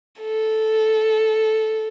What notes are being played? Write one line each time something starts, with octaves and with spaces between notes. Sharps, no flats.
A4